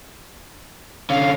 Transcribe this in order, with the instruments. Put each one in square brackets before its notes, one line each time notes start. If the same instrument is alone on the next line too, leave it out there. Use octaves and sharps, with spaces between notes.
[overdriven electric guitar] D3 C#4 [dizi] F5